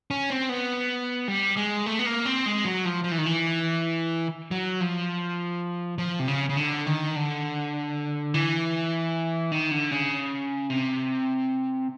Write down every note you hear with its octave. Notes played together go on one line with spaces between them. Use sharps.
C#4
C4
B3
G3
G#3
A3
B3
A#3
C4
G#3
F#3
F3
F3
E3
D#3
E3
F#3
F3
F3
C3
C#3
C#3
D3
D#3
D3
E3
D#3
D3
C#3
C3